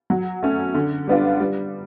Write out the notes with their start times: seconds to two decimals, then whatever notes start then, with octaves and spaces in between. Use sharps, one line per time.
0.10 F#3
0.43 A3 C#4
0.75 D3
1.07 G3 B3 D4 F4
1.40 G3